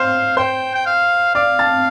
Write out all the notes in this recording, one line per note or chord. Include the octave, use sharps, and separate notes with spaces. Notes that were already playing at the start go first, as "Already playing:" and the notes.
Already playing: C5 F5 C6
C5 G5 C6
G5
F5
D5 F5 D6
A5 A6